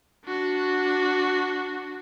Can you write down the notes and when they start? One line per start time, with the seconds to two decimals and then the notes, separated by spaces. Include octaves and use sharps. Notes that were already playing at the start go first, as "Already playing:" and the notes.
0.25 D4 F#4